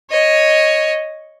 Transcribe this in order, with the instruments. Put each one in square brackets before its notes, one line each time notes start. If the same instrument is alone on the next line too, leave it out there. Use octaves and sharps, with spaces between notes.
[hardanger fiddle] C#5 D#5